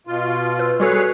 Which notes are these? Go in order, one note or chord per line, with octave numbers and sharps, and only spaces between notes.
B2 F4
B4 E6
G3 F#4 G#4 A4 B4 C#5